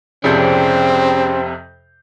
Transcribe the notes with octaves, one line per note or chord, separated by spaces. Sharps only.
F2 C3 C4 C#4 G#4 D5 G6